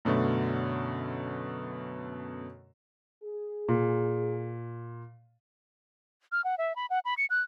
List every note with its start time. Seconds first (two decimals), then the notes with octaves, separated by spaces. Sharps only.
0.05 F#2 B2 D3 A3
3.24 G#4
3.68 A#2
6.32 F6
6.44 F#5
6.58 E5
6.76 B5
6.90 F#5
7.05 B5
7.18 C#7
7.30 F#6